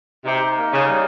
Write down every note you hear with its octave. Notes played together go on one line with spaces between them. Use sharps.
C3 D#4
A#3
C#3
G3